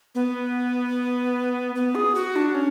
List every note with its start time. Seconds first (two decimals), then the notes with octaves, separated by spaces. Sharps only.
0.15 B3
1.75 B3
1.95 G#4
2.15 F#4
2.36 D4
2.55 C#4